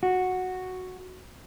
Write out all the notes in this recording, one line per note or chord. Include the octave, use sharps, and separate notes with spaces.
F#4